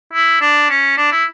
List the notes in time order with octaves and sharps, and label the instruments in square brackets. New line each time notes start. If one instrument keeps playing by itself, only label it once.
[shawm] E4
D4
C#4
D4
E4